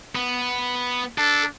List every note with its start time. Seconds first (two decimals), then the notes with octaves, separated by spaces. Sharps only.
0.15 B3
1.18 D4 A4